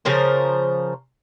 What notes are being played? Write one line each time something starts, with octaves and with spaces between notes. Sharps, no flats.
C#3 F3 A#4 C5